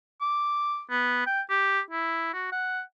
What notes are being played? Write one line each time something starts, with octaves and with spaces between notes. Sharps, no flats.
D6
B3
G5
G4
E4
F#4
F#5